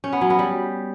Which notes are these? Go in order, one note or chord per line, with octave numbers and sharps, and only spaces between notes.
C#4
B3
F#3
B3
G3